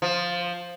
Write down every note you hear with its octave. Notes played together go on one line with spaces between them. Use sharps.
F3